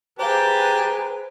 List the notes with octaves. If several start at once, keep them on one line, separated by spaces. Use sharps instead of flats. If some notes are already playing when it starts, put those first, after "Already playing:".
G4 G#4 B4 C5 F5 A5 A#5